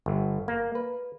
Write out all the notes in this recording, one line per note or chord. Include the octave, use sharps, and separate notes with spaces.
G1
A#3
B4